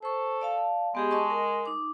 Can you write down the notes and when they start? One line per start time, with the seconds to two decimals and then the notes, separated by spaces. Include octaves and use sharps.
0.03 A4 C5 C#6
0.42 D5 F5 A5
0.95 G#3 B3 G4 G#4
1.11 D#5 A5 C#6
1.30 A#4
1.66 D#4 D6